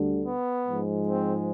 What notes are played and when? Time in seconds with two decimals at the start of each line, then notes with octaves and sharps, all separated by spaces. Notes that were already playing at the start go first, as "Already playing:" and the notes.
Already playing: D2 D3 G3
0.25 B3
0.65 G#2 F3 G#3
1.06 C4